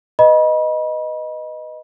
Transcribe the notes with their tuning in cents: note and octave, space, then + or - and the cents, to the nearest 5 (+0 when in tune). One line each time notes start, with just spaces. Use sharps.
B4 +0 D#5 +0 B5 -35